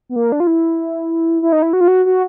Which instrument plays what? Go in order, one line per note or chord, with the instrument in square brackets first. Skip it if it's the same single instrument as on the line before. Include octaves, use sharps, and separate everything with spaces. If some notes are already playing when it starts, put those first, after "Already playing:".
[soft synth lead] B3
A#3
D4
F4
E4
E4
D#4
E4
F#4
F4
F#4
F#4